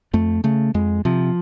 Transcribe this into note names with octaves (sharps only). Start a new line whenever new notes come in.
F2 A3
C#3 A3
F2 G#3
C3 F3